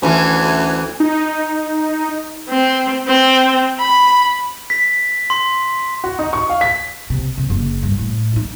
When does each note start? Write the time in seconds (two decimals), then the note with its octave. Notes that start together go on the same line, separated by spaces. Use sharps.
0.02 D2 E3 C#4
1.00 D#4
2.49 C4
3.07 C4
3.79 B5
4.70 B6
5.30 C6
6.04 F#4
6.19 D#4
6.33 C#6
6.50 F5
6.61 B6
7.10 C3
7.38 C3
7.50 F#1
7.83 G2
7.98 A2
8.36 D#4